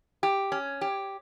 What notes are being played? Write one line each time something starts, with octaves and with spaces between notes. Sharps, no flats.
G4
C#4
G4